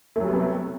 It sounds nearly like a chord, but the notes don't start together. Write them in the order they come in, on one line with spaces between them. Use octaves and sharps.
A3 F#3 G3 B3 C3